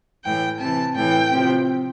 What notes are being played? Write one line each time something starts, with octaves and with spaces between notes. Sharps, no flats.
A2 E3 G5
C3 E3 A5
A2 E3 G5
C3 F3